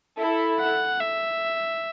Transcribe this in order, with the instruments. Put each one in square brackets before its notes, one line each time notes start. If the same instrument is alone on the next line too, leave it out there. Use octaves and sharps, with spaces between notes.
[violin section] E4 A4
[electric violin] F#5
E5